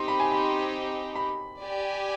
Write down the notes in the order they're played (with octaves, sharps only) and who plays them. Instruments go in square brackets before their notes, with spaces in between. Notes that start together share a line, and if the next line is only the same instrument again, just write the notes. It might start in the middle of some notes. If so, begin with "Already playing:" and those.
Already playing: [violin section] C4 D#4 G4 [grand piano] C6
[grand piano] B5
G#5
B5
B5
[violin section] G4 D5 G#5